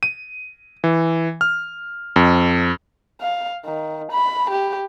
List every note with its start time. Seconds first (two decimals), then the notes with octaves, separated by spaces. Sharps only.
0.03 D#7
0.84 E3
1.41 F6
2.16 F2
3.21 F5
3.65 D#3
4.11 B5
4.50 G4